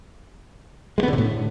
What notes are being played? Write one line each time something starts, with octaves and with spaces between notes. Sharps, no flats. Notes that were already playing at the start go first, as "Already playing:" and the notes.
G#3
B3
D3
C3
A2